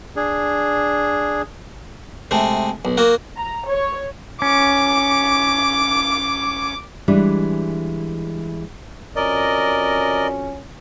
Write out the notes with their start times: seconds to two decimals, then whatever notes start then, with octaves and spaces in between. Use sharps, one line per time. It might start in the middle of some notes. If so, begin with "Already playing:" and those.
0.16 D4 G#4
2.31 C3 G#3 A3
2.85 B1
2.97 A#3 F#4
3.37 A#5
3.67 C#5
4.42 C#4 D6
7.08 E3 G3 G#3 D4
9.16 F2 C#4 F#4 A#4 D5 D#5